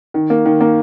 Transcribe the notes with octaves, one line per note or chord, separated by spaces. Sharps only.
D#3
A#3
D#3
A#3